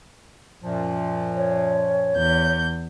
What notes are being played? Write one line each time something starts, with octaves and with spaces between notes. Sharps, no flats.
F#2 A#2 F3
C#5
E2 G6